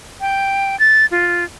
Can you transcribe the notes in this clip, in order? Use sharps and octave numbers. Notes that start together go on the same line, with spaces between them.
G5
A6
F4